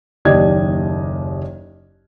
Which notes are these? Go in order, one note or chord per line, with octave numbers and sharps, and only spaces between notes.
F#1 D#2 G4 D5 D#5 G#6